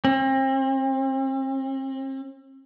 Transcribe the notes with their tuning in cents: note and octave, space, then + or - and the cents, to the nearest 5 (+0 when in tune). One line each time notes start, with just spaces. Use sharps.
C4 +40